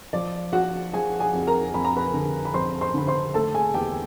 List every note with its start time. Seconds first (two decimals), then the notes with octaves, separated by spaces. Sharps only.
0.13 F3 D5
0.52 F3 F#4 F#5
0.93 F3 G#4 G#5
1.20 G#4 G#5
1.34 F2
1.47 A#4 A#5
1.74 F2 B5
1.85 A#5
1.97 B4 B5
2.14 D3
2.45 B5
2.54 F2 C5 C6
2.81 C5 C6
2.94 D3 B5
3.07 C5 C6
3.34 A3 A4 A5
3.54 G#4 G#5
3.74 E2 G4 G5